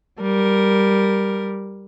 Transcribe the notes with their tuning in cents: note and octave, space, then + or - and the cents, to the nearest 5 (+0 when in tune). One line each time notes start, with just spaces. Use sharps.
G3 +0 A#4 +0